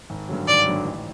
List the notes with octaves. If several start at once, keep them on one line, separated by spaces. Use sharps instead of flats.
G#1
G2 D3 F#3
G#1 D5
G2 D3 F#3
A1